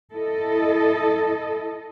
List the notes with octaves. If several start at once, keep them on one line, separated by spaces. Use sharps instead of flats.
E4 A4 D#5